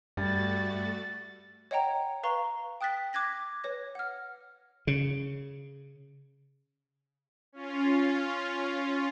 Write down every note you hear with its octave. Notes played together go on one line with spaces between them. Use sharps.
G2 G3 A3 F#4 A6
C#5 D#5 F#5 G5 A#5
B4 F5 A#5 C#6 G7
G5 D#6 F#6 A6 B6
D6 F#6 G#6 A#6 B6
B4 C#5 A#6
F#5 F6
C#3
C#4 F4